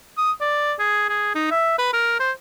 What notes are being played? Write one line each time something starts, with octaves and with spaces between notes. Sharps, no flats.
D#6
D5
G#4
G#4
D#4
E5
B4
A#4
C5